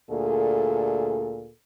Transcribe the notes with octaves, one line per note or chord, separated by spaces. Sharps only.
D2 A#2 G#4 A4